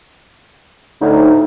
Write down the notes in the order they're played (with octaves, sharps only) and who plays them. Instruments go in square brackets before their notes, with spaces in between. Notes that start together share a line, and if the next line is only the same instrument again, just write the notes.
[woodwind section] D2 A2 [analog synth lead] D#4